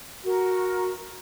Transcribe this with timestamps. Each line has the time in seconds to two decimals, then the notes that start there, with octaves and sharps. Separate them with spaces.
0.23 F#4 A#4